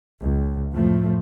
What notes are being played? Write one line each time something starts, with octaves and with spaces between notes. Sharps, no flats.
C#2
F2 A2 F3 A3